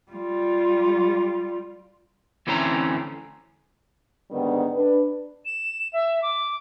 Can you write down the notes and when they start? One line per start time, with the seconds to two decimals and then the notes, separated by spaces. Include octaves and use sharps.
0.12 G3 F4
2.47 D2 E3 A3 C4 C#4 A#5
4.31 G#2 D3 D#3 G3 B3
4.73 D4 B4
5.45 E7
5.93 E5
6.22 D6